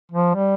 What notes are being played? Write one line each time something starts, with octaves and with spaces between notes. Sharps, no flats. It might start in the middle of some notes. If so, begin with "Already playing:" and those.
F3
G3